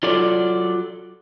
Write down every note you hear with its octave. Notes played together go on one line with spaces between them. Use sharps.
F#3 F4 A4 D5